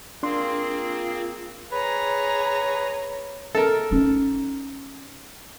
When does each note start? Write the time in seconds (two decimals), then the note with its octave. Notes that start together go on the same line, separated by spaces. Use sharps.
0.23 A#3 C4 D4 F4 G#4 C6
1.71 G#4 B4 C#5 A#5
3.55 A4 A#4
3.91 C#4 D#4